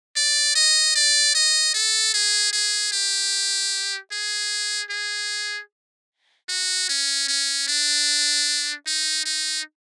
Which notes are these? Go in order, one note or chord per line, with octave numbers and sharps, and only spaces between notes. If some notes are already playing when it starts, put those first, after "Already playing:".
D5
D#5
D5
D#5
A4
G#4
G#4
G4
G#4
G#4
F#4
C#4
C#4
D4
D#4
D#4